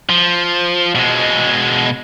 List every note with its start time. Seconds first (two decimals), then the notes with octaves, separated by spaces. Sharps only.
0.10 F3
0.95 B2 G#3